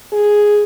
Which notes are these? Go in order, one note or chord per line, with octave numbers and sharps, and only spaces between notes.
G#4